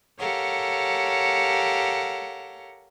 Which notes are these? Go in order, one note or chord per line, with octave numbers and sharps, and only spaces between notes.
G4 A4 A#4 C#5 F5 F#5